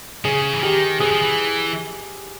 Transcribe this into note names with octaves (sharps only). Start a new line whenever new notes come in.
C#3 G#4
E3
D#3 G4
E3 G#4
F3
E3